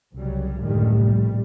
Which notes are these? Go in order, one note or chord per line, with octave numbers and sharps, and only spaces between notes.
C2 C#3 F#3 G3
C#2 F#2 A2 D3 D#3 G3
A#1 C3 G3